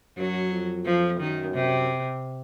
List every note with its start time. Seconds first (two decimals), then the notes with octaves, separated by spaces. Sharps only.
0.17 F#2 F#3
0.50 F2
0.85 F3
1.20 F#2 D#3
1.54 C3